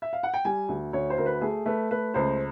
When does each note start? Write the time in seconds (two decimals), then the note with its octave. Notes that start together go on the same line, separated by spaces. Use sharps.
0.02 E5
0.13 F5
0.23 F#5
0.34 G5
0.45 G3 G#5
0.69 D2
0.93 D2 C#5
1.10 C5
1.18 D2 A#4
1.26 B4
1.41 A3 G#4
1.66 A3 B4
1.91 A3 B4
2.14 C#2 C5